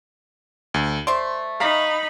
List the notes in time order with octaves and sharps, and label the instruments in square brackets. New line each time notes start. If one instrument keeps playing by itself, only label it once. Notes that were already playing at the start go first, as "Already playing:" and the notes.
[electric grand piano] D2
[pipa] A3 C5 D5 [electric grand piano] C6
[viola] D#4 B5 [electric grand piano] F5 A#5 B6